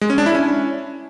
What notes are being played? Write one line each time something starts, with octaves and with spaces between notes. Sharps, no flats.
G#3
C#4
D4
E4
C#4